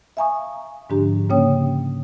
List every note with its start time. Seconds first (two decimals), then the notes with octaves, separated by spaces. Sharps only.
0.17 E5 F5 G#5 A#5 C#6 D#6
0.90 G#2 D3 F3 D4 G4 A#5
1.30 C#3 A#3 C#4 C#5 G5 D#6